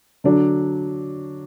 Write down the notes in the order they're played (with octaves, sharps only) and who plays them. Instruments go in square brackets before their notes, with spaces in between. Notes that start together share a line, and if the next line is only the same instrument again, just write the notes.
[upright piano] D3 F#3 D4